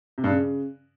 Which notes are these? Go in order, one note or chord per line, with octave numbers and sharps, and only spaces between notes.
C3
G2
C#3